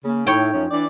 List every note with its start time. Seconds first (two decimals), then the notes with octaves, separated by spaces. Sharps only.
0.05 C#3 A#3
0.27 A2 D#4 C#5 G5
0.53 F#2 F3 C#4
0.71 E3 D4 D5